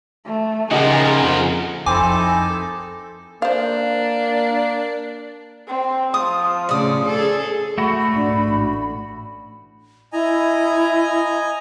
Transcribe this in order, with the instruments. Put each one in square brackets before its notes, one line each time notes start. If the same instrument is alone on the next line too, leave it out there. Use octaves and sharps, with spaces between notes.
[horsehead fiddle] A3
[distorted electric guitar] A#2 F3 [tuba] C#3 [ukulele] D#4 G4 F#5 [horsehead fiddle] G#4 A#4
[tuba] F2
[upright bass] F2 [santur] C4 E4 [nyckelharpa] D#4 A4 [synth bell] G#5 D6
[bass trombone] A#3 [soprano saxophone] D4 [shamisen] C5 F5
[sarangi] C4
[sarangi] F3 [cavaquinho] D#6
[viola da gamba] A2 C#3 [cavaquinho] D5 D#6
[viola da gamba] G#4 A4
[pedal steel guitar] A3 F#4 [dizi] B5
[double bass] G#2 D4
A1
[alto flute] E4 [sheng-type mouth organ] D#5 G#5 A#5